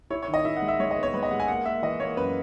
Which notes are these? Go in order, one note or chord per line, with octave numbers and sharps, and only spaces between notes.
E4 C#5
C#5
D#3
D#5
E4 E5
F#5
G#3
E5
G#3 C#5
D#5
B3
C#5
G#3 B4
D#5
G#3 F#5
G#5
A#3 F#5
A#3 E5
E3 D#5
A#3 C#5
F#2 B4